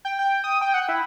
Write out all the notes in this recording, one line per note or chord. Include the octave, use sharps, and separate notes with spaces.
G5
G5
D#6
G5
F#5
E4